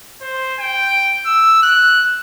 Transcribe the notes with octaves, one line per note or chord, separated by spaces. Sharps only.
C5
G5
E6
F#6